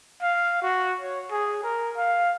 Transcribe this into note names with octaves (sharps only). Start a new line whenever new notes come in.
F5
F#4
C#5
G#4
A#4
F5